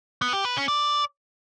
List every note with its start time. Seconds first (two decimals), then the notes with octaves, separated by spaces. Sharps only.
0.22 B3
0.33 G4
0.45 B4
0.56 C#4
0.68 D5